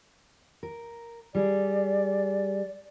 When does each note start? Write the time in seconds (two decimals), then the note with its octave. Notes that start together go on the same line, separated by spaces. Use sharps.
0.63 A#4
1.35 G3 G#4 D5